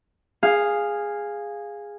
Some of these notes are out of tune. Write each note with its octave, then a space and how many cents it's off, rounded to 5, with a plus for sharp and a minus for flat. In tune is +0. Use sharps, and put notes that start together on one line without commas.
G#4 -10 F5 +0